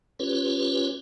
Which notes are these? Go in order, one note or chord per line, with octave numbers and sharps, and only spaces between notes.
C#4 F4 G4 B4 C#5